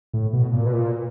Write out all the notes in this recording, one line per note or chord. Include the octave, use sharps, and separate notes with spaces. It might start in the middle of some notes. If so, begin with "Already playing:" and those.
A2
B2
A#2
B2
A#2